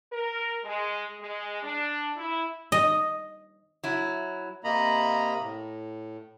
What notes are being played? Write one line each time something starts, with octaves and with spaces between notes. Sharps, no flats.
A#4
G#3
G#3
D4
E4
D#5
F#3 E4
C3 A#3 D#5 A#5 B5
A2